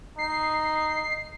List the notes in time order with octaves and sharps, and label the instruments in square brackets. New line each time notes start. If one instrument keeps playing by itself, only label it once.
[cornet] D#4 [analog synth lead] C7